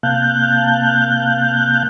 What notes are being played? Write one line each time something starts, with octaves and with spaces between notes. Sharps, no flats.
C3 A#3 F5 A5 F#6 G6